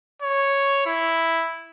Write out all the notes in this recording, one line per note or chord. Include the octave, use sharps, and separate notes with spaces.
C#5
E4